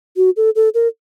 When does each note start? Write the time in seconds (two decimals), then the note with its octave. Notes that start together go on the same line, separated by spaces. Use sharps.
0.17 F#4
0.37 A4
0.56 A4
0.74 A#4